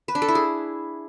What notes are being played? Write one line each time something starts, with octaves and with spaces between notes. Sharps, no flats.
B4
D4
A4
E4
G#4